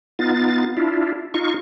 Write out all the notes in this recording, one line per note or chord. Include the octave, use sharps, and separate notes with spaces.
B3 D#4 F4 A6
D4 E4 F4
D#4 F4 C#6